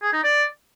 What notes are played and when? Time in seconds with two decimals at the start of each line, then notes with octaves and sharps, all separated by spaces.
0.02 G#4
0.13 D#4
0.24 D5